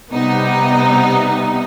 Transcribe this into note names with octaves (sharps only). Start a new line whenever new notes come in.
C3 G3 B3 D#4